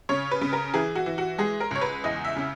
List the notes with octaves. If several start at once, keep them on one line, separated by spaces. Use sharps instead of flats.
C#3 C#5
B4
C#3
A#4
E3 G#4
F#4
E3
F#4
G#3 G#4
A#4
C#2 C#5
B4
E2 D#5
E5
C#3